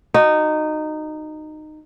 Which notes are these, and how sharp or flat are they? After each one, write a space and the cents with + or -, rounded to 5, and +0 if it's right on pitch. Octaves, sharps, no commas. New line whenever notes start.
D#4 -15 F#4 +0